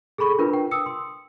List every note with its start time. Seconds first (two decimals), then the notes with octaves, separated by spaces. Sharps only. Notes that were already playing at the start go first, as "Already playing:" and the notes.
0.18 G#4 A4 B5 C#6
0.39 D4 F4 A#4 B4
0.53 G5
0.71 D#6 E6 C#7
0.86 C6